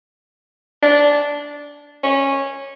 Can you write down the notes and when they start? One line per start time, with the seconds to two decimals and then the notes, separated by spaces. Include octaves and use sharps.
0.82 D4
2.03 C#4